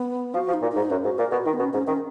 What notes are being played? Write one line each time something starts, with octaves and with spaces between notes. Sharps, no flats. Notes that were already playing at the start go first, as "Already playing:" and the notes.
Already playing: B3
F3 F#4
F3
D#4
A#2
G#2 D#4
F#2 C#4
G#2 F#4
A#2 A#4
B2 F#4
D#3 D#4
B3
B2 C#4
G#2 C#4
D#3 C#4